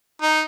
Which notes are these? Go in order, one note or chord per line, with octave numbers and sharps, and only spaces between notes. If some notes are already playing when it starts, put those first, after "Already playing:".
D#4